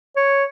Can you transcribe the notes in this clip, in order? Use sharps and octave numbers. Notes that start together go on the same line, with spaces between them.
C#5